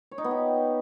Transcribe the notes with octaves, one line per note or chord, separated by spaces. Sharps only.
C#5
D#4
B3
G4